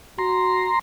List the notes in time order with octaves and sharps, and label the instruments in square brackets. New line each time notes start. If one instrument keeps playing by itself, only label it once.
[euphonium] F#4 [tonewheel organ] A#5 C6